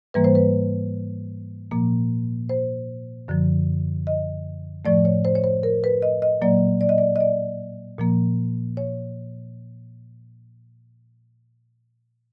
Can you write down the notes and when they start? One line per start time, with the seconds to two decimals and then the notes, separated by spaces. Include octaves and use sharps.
0.14 G#2 E3 G3 A#3 B4
0.24 C5
0.35 B4
1.71 A#2 F3 A#3
2.49 C5
3.28 F#2 D3 F3
4.07 D#5
4.85 A2 F3 A3 D5
5.05 C#5
5.25 C5
5.35 C#5
5.44 C5
5.63 A#4
5.84 B4
6.02 D#5
6.22 D#5
6.41 A#2 F#3 A#3 D5
6.81 D5
6.89 D#5
6.98 D5
7.16 D#5
7.20 D5
7.98 A#2 F3 A#3
8.77 C#5